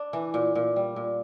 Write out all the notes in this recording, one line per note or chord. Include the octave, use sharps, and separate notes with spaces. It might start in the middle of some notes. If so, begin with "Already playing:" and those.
Already playing: D4
E3
A#2
A#2
G3
A#2